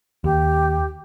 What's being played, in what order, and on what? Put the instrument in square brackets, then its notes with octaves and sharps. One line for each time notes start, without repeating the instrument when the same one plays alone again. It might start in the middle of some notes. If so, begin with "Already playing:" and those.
[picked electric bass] D#2 [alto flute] G4